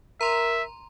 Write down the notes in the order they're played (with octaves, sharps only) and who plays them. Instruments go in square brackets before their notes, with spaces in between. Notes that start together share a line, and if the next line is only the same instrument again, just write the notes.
[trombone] A#4 [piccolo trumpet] E5 [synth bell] A#5 C6